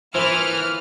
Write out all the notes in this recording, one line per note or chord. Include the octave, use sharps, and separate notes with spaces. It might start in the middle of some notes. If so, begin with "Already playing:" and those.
E3 F3 A#3 B4 F6